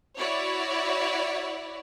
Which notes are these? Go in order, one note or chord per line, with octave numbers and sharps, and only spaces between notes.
E4 F#4 C#5 D5